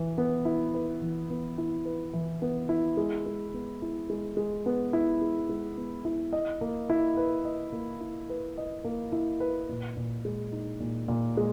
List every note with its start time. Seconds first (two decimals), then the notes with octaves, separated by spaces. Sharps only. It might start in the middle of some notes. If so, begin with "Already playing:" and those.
Already playing: E3 B4
0.18 B3
0.45 E4
0.74 B4
1.02 E3
1.30 B3
1.58 E4
1.85 B4
2.13 E3
2.42 B3
2.69 E4
2.97 G#3
3.26 G#3
3.54 B3
3.82 E4
4.10 G#3
4.37 G#3
4.66 B3
4.93 E4
5.21 G#3
5.49 G#3
5.77 B3
6.05 E4
6.33 D#5
6.61 A#3
6.90 E4
7.17 B4
7.45 D#5
7.72 A#3
8.01 E4
8.29 B4
8.58 D#5
8.84 A#3
9.12 E4
9.40 B4
9.69 A#2
9.96 A#2
10.25 G#3
10.52 D#4
10.80 A#2
11.08 A#2
11.37 G#3